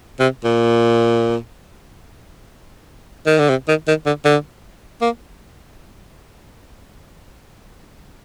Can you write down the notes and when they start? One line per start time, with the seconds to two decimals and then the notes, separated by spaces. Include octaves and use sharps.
0.20 C3
0.44 A#2
3.26 D#3
3.38 D3
3.49 C3
3.68 D#3
3.88 D#3
4.06 D3
4.25 D3
5.01 A#3